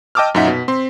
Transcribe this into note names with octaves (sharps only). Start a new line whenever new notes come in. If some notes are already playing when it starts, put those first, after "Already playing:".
D#5 G5 A5 D6 E6 F6
F#2 A#2 D#4 E5 F#5 B6
B2
C4 C6